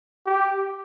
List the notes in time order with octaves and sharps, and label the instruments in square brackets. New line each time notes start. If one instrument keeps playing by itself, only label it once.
[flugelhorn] G4